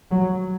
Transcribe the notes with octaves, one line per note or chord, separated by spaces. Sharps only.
F#3